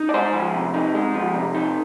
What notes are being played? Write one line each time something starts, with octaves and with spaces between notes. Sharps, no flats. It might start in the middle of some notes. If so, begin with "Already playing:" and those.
Already playing: D#4
D5
G#3 G#4 C5
F3
C3
D#4
G#3
F3
C3
D#4